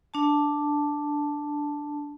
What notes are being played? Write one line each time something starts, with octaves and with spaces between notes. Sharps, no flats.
D4 A5